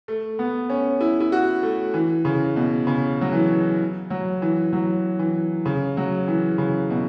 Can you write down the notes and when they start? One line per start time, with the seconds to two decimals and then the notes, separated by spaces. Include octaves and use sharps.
0.08 A3
0.39 B3
0.70 C#4
1.01 E4
1.20 E4
1.32 F#4
1.63 A3
1.94 E3
2.25 C#3
2.56 B2
2.87 C#3
3.21 F#3
3.33 E3
4.10 F#3
4.42 E3
4.73 F#3
5.19 E3
5.66 C#3
5.97 F#3
6.28 E3
6.58 C#3
6.90 B2